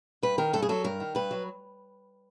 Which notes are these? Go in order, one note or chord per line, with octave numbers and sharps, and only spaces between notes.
G2 B4
D#3 A#4
G2 A4
G#4
F#3 A4
G2 A#4
D#3
G2 B4
F#3